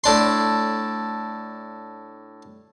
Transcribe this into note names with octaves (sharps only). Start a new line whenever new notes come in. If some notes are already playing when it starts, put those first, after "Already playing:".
A2 D4 C6